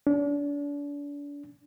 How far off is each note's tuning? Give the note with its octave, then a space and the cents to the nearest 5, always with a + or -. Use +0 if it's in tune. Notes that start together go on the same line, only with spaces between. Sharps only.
D4 -35